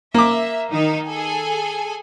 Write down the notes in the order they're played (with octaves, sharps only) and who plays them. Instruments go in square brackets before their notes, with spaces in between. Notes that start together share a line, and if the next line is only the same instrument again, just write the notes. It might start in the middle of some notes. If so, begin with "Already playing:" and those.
[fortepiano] A#3 D6 [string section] E5
[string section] D#3 D#4
G#4 A4 G#5